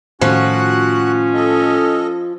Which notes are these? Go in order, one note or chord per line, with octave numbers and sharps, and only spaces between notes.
A2 D#3 F3 C#4 F#4 F#5 F#6
A4 D#5